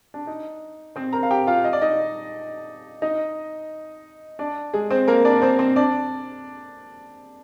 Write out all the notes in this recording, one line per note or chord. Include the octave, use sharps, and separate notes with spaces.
D4
D#4
C4 C5
A#4 A#5
F5
G4 G5
F4 F5
D#5
D5
D#4 D#5
D#4 D#5
D4 D5
G#3 G#4
C4 C5
A#3 A#4
D4 D5
C4 C5
C4 C5
D4 D5